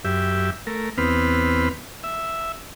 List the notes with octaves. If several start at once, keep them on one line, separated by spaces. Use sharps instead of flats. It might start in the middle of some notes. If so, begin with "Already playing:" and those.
F#2 G4 E5
A3 A#4
E2 B3 C4 B4 F6
E5